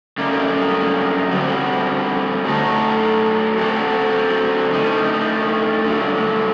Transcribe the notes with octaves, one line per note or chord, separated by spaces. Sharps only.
F#2 D3 G3 A#3 D#4
D3 G3 C4 F#4
F#3 A3 D#4 A4
D3 F#3 C4 F#4 A4
D3 A3 D#4
G2 D3 F#3